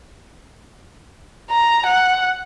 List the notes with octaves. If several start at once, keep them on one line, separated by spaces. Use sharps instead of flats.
A#5
F#5